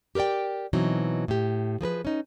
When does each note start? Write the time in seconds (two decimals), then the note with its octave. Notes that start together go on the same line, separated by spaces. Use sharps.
0.15 G4 A#4 B4 D5 G5
0.73 B2 E3 F#3 C4 D#4
1.28 A2 G4
1.81 F3 G#4 A#4 B4
2.05 C#4 D#4